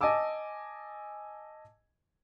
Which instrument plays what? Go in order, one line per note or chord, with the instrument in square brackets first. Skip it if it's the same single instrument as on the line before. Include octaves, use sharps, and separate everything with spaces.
[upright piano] D#5 G#5 A5 D6 E6